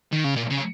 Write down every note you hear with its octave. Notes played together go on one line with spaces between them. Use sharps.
D#3
C#3
A#2
C#3